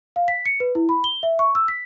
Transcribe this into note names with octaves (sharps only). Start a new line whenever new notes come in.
F5
B6
C#7
B4
E4
B5
G7
E5
C#6
E6
B6